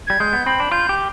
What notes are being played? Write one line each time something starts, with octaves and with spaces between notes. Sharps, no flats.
G3 G#6
G#3 G6
B3
C4 B5
D4
F4 G6
G4